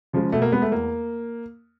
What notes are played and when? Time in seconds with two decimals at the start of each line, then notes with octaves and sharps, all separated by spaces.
0.13 C#3 F3 G#3
0.32 B2 A3
0.42 A#3
0.52 G#3 B3
0.62 A3
0.71 E2 A#3